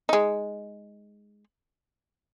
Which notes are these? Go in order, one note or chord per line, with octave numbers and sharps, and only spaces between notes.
G#3 D#4